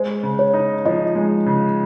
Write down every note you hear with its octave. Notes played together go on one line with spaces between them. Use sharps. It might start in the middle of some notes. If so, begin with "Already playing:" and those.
Already playing: G#3 C5
C#3
C#5
D#4
F3 D#5
G#3
C#3